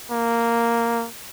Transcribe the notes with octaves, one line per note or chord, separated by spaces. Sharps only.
A#3